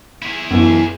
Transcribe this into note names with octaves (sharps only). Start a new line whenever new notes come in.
E4 G#4
B1 F#2 E3 B3